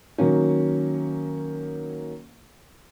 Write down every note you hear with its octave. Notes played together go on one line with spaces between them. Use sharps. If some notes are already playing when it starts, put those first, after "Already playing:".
D#3 F#3 A#3 C#4